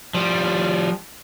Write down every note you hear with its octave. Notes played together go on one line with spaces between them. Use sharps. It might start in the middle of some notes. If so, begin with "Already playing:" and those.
F3 G3